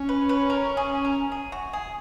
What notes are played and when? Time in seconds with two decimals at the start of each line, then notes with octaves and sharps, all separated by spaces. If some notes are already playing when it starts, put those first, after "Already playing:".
Already playing: C#4
0.09 B4
0.29 B4
0.50 A#4
0.77 G#4
1.05 A#4
1.32 G#4
1.52 F#4
1.73 G#4